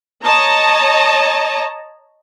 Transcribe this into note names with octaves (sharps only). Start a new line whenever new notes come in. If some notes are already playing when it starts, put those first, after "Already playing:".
C#5 D#5 A5 A#5